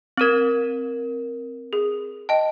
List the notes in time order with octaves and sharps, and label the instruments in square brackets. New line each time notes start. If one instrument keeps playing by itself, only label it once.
[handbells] C4 A#4 [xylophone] G#6 D#7 F#7
[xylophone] G#4
[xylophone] D#5 G5 [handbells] A5